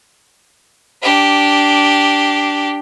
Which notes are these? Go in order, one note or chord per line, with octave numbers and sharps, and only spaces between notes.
D4 G4